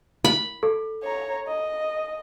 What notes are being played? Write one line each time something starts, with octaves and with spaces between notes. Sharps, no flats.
B5
A4
C#5 A#5
D#5